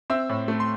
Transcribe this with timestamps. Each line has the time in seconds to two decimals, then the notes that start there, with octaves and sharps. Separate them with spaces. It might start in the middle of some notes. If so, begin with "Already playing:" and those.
0.10 C4 E5 E6
0.29 A2
0.48 A3
0.60 C6